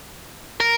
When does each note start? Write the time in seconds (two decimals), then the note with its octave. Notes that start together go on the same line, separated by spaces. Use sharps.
0.60 A#4